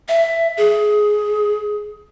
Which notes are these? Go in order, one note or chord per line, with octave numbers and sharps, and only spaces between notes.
E5
G#4